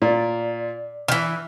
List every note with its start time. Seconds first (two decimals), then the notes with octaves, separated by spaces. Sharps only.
0.02 A#2 D5
1.08 D#3 E3 F6